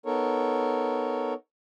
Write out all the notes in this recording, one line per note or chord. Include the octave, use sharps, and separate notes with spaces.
B3 D#4 A4 A#4 C#5